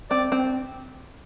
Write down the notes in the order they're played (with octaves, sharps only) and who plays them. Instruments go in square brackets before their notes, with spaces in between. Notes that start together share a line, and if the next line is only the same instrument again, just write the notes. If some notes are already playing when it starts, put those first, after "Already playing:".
[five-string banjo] C4 [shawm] D5
[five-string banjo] C4